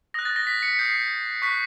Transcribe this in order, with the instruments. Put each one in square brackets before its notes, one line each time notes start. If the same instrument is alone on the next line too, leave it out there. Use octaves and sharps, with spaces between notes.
[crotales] D#6 F#6 A#6
A6
A#6
B6
C#7
B6
D#6 G6 C7
C#6 F#6 B6